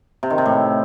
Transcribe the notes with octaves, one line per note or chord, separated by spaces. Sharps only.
C3
D#3
C3
A2